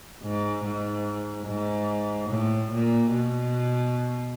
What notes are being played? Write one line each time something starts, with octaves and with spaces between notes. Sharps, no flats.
G#2
G#2
G#2
A2
A#2
B2